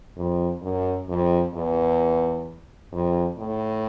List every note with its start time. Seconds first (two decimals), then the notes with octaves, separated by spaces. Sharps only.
0.17 F2
0.62 F#2
1.09 F2
1.55 E2
2.93 F2
3.38 A2